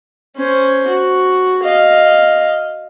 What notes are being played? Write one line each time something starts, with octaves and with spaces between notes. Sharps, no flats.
C#4 C5
F#4
D#5 F5